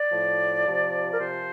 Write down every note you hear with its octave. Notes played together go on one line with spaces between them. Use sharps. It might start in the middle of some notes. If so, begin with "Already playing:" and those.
Already playing: D5
A2 F3
C3 F3
A#4
C3 F3 C5